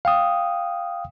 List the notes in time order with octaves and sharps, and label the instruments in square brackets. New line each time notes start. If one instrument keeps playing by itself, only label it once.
[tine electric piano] F5 G5 D#6